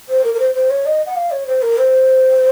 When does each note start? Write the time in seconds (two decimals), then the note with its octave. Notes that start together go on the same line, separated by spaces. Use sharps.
0.09 C5
0.24 A#4
0.34 A#4
0.39 C5
0.55 C5
0.70 C#5
0.86 D#5
1.06 F#5
1.16 F5
1.31 C#5
1.47 C5
1.62 A#4
1.78 C5